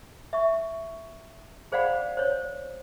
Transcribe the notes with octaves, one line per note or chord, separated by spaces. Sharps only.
E5 C#6
G#4 C5 D5 F5 F#5 B5
C5 C#5